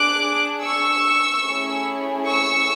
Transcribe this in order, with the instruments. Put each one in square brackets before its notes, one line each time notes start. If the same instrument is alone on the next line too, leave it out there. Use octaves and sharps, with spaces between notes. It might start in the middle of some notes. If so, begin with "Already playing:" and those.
Already playing: [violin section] D4 G#4 D6 F#6
C#6 E6
A3 C#4 E4 G#4
C#6 E6